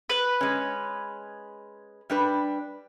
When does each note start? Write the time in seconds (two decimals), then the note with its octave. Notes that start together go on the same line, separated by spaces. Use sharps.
0.10 B4
0.41 G#3 C#4
2.10 G3 D4 B4